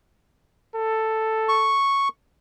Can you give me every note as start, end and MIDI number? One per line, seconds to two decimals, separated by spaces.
0.76 1.78 69
1.49 2.08 85